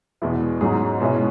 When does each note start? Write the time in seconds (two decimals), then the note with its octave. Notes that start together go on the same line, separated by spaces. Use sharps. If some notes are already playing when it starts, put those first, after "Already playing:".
0.22 E2 B2 G#3 B3 E4
0.61 G#2 F#3 C#4 G#4
1.00 B2 G#3 C#4 E4